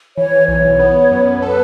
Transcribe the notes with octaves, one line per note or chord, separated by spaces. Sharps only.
E3 C#5
B1 C#5
B3
F#2
A4 B4